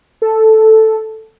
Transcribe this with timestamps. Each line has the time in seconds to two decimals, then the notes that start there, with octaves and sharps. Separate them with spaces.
0.22 A4